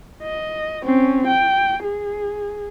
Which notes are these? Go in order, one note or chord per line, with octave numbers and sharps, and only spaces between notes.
D#5
C4 C#4
G5
G#4